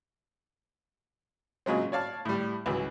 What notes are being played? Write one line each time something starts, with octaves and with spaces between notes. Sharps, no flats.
A#2 C#3 F#3 G#3 C4
C#5 D5 F5 A5
A2 G3
C#2 E3 F#3